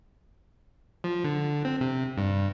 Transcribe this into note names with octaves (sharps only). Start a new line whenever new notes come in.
F3
D3
C4
C3
G2